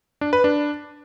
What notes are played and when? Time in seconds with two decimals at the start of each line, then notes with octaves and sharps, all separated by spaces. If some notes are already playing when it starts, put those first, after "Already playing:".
0.21 D4
0.33 B4
0.44 D4